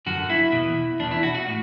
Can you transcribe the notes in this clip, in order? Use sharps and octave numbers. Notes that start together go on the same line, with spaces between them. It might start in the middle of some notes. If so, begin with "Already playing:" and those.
F#2 D3 F#4
E4
E2 B2
E2 B2 D4
E4
F#4
F#4
A2